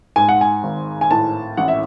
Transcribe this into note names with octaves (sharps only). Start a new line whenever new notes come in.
G#2 G#5
F#5
G#5
G#1
G#5
A2 A5
A1 F#5
E5